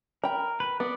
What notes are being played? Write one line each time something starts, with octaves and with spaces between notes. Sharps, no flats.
A#4 G5 B5
B4
B3 D5